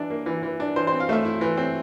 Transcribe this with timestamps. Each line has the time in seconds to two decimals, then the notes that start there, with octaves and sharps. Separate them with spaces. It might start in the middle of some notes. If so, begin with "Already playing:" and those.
Already playing: E3 D4 E4
0.10 A#3
0.26 E3
0.43 E3
0.60 D4
0.76 E3 C5
0.87 C5
0.93 C4
1.00 F5
1.09 A3 E5
1.25 E4
1.41 E3
1.57 C4